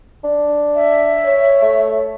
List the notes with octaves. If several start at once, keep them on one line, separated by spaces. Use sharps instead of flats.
D4
E5
C#5
A3